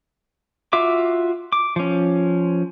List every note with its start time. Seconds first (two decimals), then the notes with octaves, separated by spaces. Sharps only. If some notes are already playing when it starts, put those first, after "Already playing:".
0.73 F4 F#4 E5 D6
1.52 D6
1.76 F3 C#4